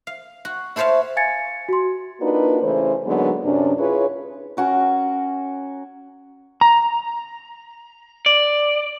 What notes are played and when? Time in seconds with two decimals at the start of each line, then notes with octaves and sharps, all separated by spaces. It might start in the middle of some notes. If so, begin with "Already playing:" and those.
0.07 F5
0.45 F#4
0.76 E4 A4 C5 C#5 E5 F5
1.16 F5 G#5 G#6 A6 C#7
1.69 F#4 C6
2.21 A#3 D4 D#4 F4 F#4 B4
2.62 C#3 E3 A3 C5
3.05 D3 F#3 G#3 A#3 B3 D#4
3.44 F#2 C3 C#4 D4
3.78 E4 F4 G#4 B4 C#5
4.57 C#4 F#4 A#4
6.61 A#5
8.26 D5